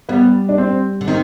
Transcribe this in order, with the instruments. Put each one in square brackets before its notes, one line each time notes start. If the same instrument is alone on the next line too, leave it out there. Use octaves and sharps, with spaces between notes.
[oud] G3 [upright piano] B3
[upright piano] D4
C4
[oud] D3
[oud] D#3 [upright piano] C4 D#4